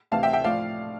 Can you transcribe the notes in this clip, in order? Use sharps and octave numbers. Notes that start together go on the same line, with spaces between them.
D2 C3 E3 F5 A5
E5 G5
E5 G5
A2 F3 D5 F5